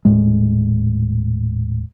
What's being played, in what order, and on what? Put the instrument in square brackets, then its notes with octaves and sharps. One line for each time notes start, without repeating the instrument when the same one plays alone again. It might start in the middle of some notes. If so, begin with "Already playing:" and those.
[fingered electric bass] D#1 A2 G#3